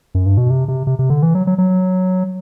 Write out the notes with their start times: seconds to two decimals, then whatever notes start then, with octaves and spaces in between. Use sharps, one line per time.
0.15 F#2
0.26 G2
0.37 B2
0.50 C3
0.68 C3
0.87 C3
0.99 C3
1.10 D3
1.23 E3
1.35 F#3
1.47 F#3
1.58 F#3